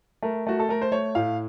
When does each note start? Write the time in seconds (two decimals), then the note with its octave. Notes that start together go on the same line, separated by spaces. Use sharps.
0.23 A3 A#4
0.47 A3 F#4
0.59 A4
0.69 A3 A#4
0.82 C5
0.92 A3 C#5
1.15 A2 F5